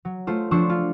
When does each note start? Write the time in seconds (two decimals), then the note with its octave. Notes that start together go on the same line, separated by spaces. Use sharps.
0.05 F#3
0.27 A3 F4 C5
0.51 F3 D4 C5 C#6 E6
0.69 F4